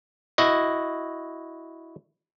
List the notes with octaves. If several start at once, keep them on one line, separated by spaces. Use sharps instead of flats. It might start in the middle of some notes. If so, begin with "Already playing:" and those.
E4 F#4 D#5